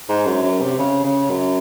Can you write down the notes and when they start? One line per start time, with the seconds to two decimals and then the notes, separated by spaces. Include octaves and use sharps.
0.09 G#2
0.26 F#2
0.43 F#2
0.61 C3
0.79 C#3
1.04 C#3
1.30 F#2